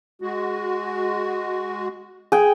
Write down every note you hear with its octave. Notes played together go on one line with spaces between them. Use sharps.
G#3 F#4
G#4 G5